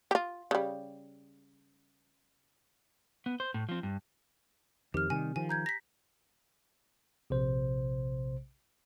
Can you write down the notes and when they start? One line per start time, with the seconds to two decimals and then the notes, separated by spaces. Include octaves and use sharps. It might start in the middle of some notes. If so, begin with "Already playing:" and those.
0.11 F4 G4
0.51 C#3 G3
3.26 B3
3.40 C5
3.54 A2
3.69 F3 C4
3.83 G2
4.94 F2 D#3 C4 G4 F6
5.10 C3 D#3 G3 G#5
5.36 D#3 F3 G#5
5.49 A#5 G6 G#6
5.66 A#6 B6
7.30 A#1 C3 C5